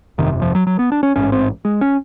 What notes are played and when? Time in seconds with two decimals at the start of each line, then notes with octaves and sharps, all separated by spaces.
0.18 G1 F2 C3 D#3
0.42 F3
0.55 F#3
0.67 F#3
0.79 B3
0.92 D4
1.03 C#4
1.16 A1 G#2 C#4
1.32 C4
1.65 G#3
1.81 C#4